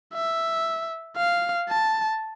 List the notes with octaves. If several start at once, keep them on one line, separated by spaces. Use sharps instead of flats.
E5
F5
A5